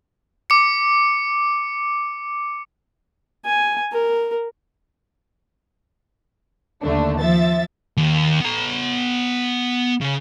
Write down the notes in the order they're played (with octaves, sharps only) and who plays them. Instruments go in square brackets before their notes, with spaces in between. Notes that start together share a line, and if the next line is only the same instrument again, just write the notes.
[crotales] D6 C#7
[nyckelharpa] G#5
A#4
[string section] D#2 D3 A3 D4
F3 E5 A6
[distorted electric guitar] D#2
B3 A#5
C#3